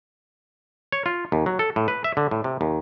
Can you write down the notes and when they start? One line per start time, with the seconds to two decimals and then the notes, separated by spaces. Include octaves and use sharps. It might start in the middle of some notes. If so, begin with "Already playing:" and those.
0.92 C#5
1.06 F4
1.32 D#2
1.46 F#3
1.59 A4
1.76 A2
1.88 B4
2.04 E5
2.17 D3
2.31 A2
2.44 C3
2.61 D#2